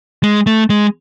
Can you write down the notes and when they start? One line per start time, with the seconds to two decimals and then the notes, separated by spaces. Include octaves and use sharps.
0.23 G#3
0.46 A3
0.70 G#3